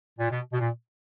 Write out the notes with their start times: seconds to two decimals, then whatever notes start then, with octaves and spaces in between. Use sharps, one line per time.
0.19 A#2
0.30 B2
0.53 B2
0.60 A#2